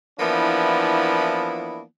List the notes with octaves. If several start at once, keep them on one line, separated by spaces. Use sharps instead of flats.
E3 F3 A#3 B3 D4 E4